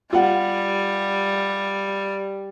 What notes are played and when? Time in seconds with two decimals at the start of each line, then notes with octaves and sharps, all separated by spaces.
0.13 G3 F4 F#5